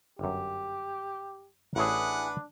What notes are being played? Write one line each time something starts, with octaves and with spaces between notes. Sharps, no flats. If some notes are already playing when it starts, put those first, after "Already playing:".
G1 F#2 G4
A1 A3 D4 E4 G#4 B4 C#5 F#5